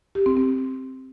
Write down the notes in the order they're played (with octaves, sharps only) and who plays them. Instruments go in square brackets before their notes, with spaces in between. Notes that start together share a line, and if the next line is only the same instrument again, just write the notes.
[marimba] G4
C4
C4